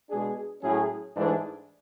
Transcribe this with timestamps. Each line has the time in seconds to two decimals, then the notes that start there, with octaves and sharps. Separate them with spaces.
0.09 B2 G#3 D4 G#4
0.61 A2 F#3 C#4 G#4
1.13 G#2 E3 A3 D4 G#4